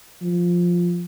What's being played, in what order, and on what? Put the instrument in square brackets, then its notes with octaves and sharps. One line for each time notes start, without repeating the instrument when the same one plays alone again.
[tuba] F3